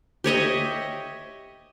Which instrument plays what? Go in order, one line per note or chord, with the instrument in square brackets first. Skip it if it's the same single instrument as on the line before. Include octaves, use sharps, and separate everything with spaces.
[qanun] G4 C#5 D#5 E5